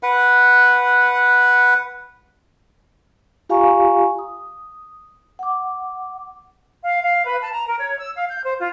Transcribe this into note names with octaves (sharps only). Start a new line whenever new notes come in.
B4 F#5
F4 G4 F5 G#5 A#5 C#6
D#6
F#5 D6
F5
F5
B4
A5
A#5
A#4
C#5
E6
F5
G6
C5
F4